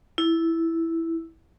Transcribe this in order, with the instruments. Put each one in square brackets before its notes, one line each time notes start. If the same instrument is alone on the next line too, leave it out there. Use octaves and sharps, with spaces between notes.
[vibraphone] E4